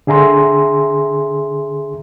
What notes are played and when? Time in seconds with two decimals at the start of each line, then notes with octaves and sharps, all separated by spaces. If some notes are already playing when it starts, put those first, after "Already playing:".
0.07 D3 G#4 E5 A#5 C6